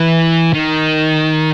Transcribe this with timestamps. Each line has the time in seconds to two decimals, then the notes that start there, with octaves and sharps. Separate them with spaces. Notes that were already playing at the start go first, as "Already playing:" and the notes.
Already playing: E3
0.54 D#3